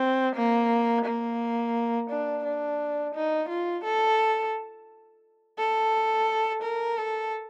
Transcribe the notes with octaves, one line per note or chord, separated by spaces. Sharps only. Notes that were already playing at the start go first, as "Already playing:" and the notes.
Already playing: C4
A#3
A#3
D4
D4
D#4
F4
A4
A4
A#4
A4